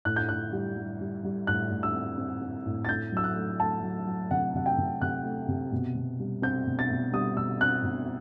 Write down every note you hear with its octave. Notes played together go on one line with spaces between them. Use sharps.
A2 F#6
G6
A2 F#6
G3
G3
G3
G3
A2 F#6
A2
E6
C4
C4
C4
A2
A6
A3 G6
F#3 E6
F#6
A3
A3 A5
F#3
F#3
C3 F#5
C3 F#5
G5
C3
C3 F#6
A3
C3
B2
B2
G3
C4 G6
B2
A6
B2
G3 D#6
B2 E6
C4 F#6
B2